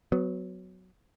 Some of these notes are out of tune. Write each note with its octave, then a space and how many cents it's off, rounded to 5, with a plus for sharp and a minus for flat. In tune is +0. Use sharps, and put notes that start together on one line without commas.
F#3 +0 B3 +25